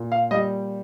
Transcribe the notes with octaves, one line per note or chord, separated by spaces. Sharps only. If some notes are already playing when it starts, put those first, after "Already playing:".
Already playing: A#2
F5
G3 D#5